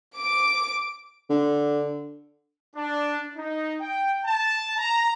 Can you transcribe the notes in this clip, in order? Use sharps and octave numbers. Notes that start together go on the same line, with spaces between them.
D6 D7
D3
D4
D#4
G5
A5
A#5